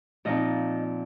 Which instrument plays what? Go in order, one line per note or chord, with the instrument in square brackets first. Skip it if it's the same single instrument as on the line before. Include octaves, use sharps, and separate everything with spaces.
[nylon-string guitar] A#2 F3 C4 D#4 D#5